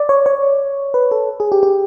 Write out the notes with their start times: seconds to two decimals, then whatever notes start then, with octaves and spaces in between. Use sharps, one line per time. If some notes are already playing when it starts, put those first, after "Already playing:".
Already playing: D5
0.09 C#5
0.26 C#5
0.94 B4
1.11 A4
1.40 G#4
1.52 G4
1.63 G4